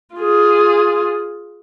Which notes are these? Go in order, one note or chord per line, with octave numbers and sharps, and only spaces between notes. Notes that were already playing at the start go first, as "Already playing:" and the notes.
F4 G#4